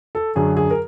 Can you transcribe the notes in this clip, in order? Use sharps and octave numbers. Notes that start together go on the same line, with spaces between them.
A4
F#2 D3 F#3 G#4
G#4
A#4